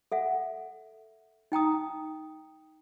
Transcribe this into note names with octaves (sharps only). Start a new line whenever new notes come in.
A4 E5 F#5
D#4 G5 A#5 D#6